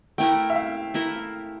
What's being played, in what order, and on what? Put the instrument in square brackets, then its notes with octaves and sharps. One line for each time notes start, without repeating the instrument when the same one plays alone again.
[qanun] A3 E4 A#4 [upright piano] G5
[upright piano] E5
F5
[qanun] A3 E4 A#4